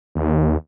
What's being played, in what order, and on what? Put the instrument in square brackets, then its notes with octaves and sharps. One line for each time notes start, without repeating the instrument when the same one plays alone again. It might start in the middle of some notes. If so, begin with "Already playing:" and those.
[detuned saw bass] D#2